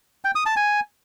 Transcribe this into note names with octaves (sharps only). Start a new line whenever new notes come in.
G5
D#6
A5
G#5